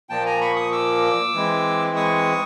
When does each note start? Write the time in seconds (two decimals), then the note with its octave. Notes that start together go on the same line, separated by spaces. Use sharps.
0.09 A#2 F3 A#3 G5 A5
0.25 G#5 A#5
0.41 B5 C#6
0.56 C#6 D#6
0.72 D6 E6
1.34 E3 G#3 C4 E4
1.96 C#6 D#6